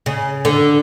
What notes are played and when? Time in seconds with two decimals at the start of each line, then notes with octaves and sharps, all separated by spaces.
0.06 C#3
0.45 D3